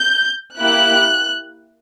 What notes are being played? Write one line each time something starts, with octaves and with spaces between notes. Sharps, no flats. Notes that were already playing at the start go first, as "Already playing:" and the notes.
Already playing: G6
A#3 E4 G4 F#6